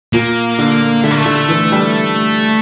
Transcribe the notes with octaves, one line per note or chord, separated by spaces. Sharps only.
A#2 A#3
D3
D3 A3
A#3
A3
D3
E3
G3